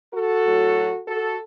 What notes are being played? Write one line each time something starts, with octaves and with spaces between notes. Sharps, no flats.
F#4 A4
A2 F#3
F#4 A4